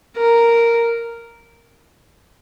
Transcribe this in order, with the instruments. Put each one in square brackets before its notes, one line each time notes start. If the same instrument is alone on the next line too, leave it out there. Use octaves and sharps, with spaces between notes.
[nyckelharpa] A#4